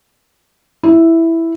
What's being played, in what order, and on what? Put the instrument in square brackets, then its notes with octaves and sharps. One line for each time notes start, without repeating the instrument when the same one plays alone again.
[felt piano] E4